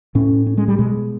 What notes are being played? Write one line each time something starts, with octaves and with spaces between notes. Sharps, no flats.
A2 C#4
C#4
G#3
G3
B2 G#3